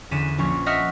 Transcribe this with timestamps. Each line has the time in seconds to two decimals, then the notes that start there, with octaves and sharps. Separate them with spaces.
0.11 E2 D3 C#4 B6 D#7 E7
0.38 A#1 C#4 C#6
0.66 D#5 E5 F#5 C#6 F6 B6